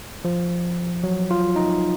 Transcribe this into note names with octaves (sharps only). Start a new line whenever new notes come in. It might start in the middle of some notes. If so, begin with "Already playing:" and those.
F3
F#3
F4
D#4